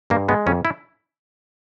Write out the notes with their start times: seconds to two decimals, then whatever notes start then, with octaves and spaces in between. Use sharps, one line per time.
0.10 G2 A#3
0.29 G#3 B3
0.46 F2 C#4
0.65 E4